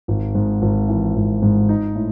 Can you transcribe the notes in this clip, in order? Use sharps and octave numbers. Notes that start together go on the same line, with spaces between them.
G#1
G#2
G#1
E3
G#1
G#2
D#4
A2